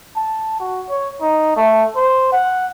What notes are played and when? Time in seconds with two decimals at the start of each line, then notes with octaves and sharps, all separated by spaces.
0.16 A5
0.60 F#4
0.89 C#5
1.22 D#4
1.56 A3
1.96 C5
2.32 F#5